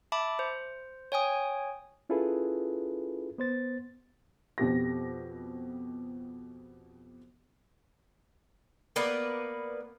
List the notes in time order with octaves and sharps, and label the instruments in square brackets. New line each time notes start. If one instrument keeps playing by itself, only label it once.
[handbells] E5 A5 B5 D6
C5
C#5 G5 G#5 D#6
[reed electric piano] C#4 E4 F4 G#4 A4 B4
B3 C5 A6
[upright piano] F2 B2 G4 A#6
[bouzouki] A#3 B3 B4 D5